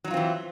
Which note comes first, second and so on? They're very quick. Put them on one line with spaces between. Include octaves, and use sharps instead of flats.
F#3 D#4 F4 C4 E3